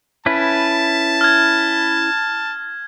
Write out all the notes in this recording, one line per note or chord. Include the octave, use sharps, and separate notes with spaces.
C#4 E4 B4 A5
F6 G#6